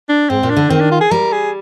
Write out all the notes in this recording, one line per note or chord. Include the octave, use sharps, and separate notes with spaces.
D4
G#2 C4
A#2
D4
D3
D#3 C4
D4
F4
G#4
G3 A#4
G#4